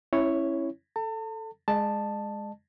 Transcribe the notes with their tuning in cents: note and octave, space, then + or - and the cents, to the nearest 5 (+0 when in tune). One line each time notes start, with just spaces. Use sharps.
C#4 -35 E4 +0 C#5 +0
A4 +0 A5 +40
G#3 +0 D#5 -40 A5 +0